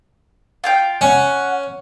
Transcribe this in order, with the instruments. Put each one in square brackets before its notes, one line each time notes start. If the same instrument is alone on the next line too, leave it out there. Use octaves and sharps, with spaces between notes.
[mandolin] F4 F5 G5
[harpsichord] C#4 [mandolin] F#5